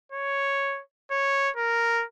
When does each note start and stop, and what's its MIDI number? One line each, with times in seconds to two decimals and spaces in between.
0.12 0.81 73
1.11 1.50 73
1.56 2.04 70